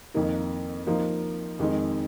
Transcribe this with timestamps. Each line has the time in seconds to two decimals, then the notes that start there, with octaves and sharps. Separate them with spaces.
0.14 F2 D#3 A#3 D#4
0.87 F3 A#3 D#4
1.59 F2 D#3 G#3